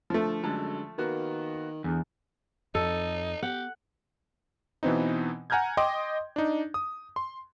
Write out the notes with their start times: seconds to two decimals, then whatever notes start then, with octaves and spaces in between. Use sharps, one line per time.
0.10 D3 F3 A3
0.43 F#2 D3 G#3 A5
0.98 D#3 A#3 B3 F#4
1.84 E2 D3
2.75 F2 D#4 A4
3.43 B3 G4 F#5
4.83 B2 E3 B3 C4 D#4
5.50 F#5 G#5 A#5 F6 G6 G#6
5.77 D#5 G5 C6 D6
6.36 D4 D#4
6.74 D#6
7.16 C6